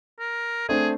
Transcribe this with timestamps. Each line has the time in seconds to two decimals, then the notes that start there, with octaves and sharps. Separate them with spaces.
0.20 A#4
0.69 A3 C4 D4 G#4